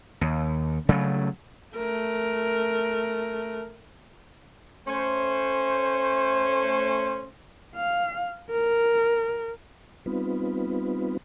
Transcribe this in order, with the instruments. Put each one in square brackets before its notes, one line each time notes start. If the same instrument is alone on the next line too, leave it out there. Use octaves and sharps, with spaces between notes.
[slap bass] D#2
C#3 F#3 A3
[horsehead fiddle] A3 A#4
[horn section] A3 C#4 C5
[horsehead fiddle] F5
A#4
[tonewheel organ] G3 B3 C4 D#4 F4 B4